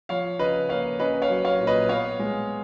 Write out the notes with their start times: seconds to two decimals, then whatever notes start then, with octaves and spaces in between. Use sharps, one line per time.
0.09 F3 C#5 F5
0.39 C#3 B4 D#5
0.69 A#3 C#5 F5
0.99 C#4 B4 D#5
1.22 C#5 F5
1.30 F#3
1.45 C#5 F5
1.59 A#2
1.67 B4 D#5
1.89 B3 C#5 F5
2.20 G#3